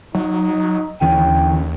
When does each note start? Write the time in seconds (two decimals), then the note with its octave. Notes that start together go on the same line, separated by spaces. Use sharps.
0.15 F#3 D#4
1.01 D#2 D3 E3 C#4 G5